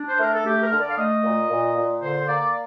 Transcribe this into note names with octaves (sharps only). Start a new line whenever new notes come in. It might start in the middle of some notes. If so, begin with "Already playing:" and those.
Already playing: D4
C5
A3 A#4
A4
A3 G4
A#4
D3
D5
F5
A3 D#5
A#2
A#2
A#2
D3 C5
A#3 D5